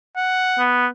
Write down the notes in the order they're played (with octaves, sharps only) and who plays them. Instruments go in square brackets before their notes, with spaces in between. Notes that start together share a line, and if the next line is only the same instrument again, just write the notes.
[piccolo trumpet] F#5
[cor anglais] B3